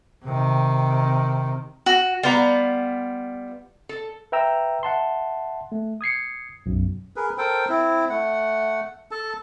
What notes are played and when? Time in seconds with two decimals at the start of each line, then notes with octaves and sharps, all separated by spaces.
0.25 C3 D#3
1.86 F#4
2.23 G3 B3 F4 A#5
3.89 A4
4.32 B4 E5 G5 A#5 E6
4.83 E5 F#5 A5 C6
5.72 A3
6.01 D#6 G#6 C7 C#7
6.66 B1 F#2
7.16 G#4 A#4 B4
7.38 A4 A#4 C5 G5
7.69 C4 E4
8.10 A3 F#5
9.11 A4 A5